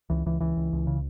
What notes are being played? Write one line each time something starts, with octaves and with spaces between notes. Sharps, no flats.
C#2 E3
C#2 E3
C#2 E3
C#2
C#2
C#3